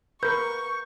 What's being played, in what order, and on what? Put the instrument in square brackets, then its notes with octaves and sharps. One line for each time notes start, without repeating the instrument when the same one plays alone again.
[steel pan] A#4 B4 [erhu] C#6 [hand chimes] G6